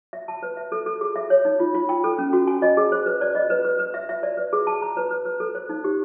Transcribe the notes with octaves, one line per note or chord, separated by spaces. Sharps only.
E5
A5
B4
E5
A4
A4
G#4
E5
C#5
D#4
F4
F4
G5
A4
C#4
F#4
G#5
D#5
G#4
C5
B4
D5
D#5
B4
B4
B4
E5
E5
D5
B4
G#4
A5
A#5
B4
B4
B4
A4
C5
D#4
G4